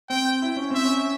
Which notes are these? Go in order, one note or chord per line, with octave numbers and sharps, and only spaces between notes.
C4 G5
E4
C#4
C4 E5
C#4